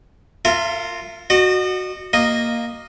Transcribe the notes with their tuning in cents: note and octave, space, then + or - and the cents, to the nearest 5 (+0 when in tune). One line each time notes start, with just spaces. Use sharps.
F4 +0 A#4 -35 E5 +30
F#4 -5 D#5 -40
A#3 +0 D#5 -10